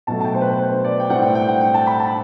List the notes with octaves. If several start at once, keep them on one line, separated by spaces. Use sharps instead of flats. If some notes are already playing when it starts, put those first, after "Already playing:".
B2 F#3 A3 A5
A5
G5
C5
B4
B4
C5
D5
G5
A2 G3 C4 F#5
G5
G5
F#5
G5
A5
B5
A5